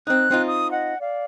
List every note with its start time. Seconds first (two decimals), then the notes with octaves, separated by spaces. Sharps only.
0.07 C4 D#4 F#6
0.31 C4 D#4 F4
0.47 D#6
0.71 D#5 F#5
0.99 D5 F5